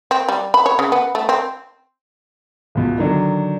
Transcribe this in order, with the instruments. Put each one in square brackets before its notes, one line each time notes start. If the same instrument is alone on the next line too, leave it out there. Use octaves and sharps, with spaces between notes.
[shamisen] C4
G3
B5
C#5
C#3
B3
A3
C4
[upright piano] C#2 B2
D3 D#3 F#3 D4